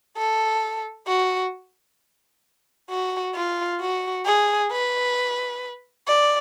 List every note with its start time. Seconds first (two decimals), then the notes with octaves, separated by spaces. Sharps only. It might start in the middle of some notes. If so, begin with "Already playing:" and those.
0.17 A4
1.08 F#4
2.90 F#4
3.35 F4
3.80 F#4
4.26 G#4
4.71 B4
6.08 D5